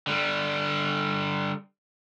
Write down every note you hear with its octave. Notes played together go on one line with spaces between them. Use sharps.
D3 G3